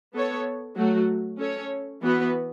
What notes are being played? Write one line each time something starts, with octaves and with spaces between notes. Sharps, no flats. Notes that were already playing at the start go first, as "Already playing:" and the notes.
B3 A4 C#5
F#3 A3 F#4
C#4 A4 C#5
E3 B3 F#4 B4